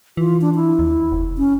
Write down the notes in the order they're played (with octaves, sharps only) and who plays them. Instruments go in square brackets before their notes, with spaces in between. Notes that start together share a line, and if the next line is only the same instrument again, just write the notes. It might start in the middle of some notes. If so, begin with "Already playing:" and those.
[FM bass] E3 [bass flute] F4
[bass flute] D4
E4
[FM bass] D#2
F1
[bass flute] C#4